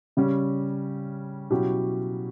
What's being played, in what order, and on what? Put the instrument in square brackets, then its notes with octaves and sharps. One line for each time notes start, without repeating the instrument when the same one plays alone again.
[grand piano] C#3 G3 C#4
B2 F#3 C#4 E4 G4